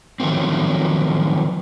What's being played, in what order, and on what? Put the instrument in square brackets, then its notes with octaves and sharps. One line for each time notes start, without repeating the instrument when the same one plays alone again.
[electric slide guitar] D#3 F3 F#3 A3 C4